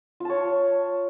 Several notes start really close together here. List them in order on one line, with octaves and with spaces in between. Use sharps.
F4 A5 C#5